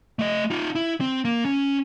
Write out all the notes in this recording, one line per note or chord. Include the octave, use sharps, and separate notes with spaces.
A3 D#5
D#4 F4
E4
C4
A#3
C#4